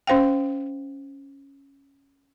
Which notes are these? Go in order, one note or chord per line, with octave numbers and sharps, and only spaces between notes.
C#4 C5 F5 G5